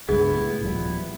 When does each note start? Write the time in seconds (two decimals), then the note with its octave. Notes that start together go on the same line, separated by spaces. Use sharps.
0.09 C#2 G2 B3 E4 G#4
0.32 A2
0.63 D#1 F3 G3